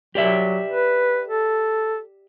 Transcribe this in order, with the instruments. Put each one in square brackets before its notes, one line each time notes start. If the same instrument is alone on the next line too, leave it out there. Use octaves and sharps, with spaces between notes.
[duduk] F#3 [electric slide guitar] G4 D5 E5
[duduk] B4
A4